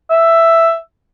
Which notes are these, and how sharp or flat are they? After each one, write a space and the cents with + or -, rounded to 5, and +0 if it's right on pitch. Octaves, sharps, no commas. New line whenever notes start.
E5 +5